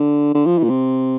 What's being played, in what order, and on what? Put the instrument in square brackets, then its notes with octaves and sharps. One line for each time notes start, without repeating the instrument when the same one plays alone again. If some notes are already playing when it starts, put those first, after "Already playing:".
Already playing: [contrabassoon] D3
D3
F3
E3
A#2
C3